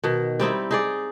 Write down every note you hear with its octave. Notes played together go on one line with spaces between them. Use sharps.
B2 D#3
G3 C4 D#4 E4
D#4 G#4 D5